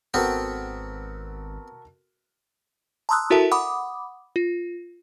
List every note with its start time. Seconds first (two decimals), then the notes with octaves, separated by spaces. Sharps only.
0.14 G#1 B3 C4 F#4 A4 A#4
3.09 A5 A#5 C6 D#6 E6 F#6
3.30 E4 F#4 A4 A#4 E5 A5
3.51 F#5 B5 D6 D#6
4.36 F4